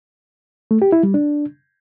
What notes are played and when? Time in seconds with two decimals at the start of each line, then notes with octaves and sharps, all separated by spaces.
0.71 A3
0.82 G4
0.92 E4
1.03 G3
1.14 D4